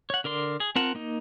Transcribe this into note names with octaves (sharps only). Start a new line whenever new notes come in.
C#5 F#5
D3 A#4 D5 C6
G#4
C4 F4 A#4 F#5 A5
A#3 D#4